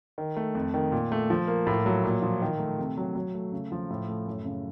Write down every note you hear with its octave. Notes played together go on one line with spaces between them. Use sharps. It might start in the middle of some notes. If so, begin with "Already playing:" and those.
D#3
A3
F2
D#3
A#2
A3
F3
A#3
A2
F#3
A#2
F3
D#3
A3
C3
F#3
F#3
A3
C#3
F3
A2
A3
F#2
C#3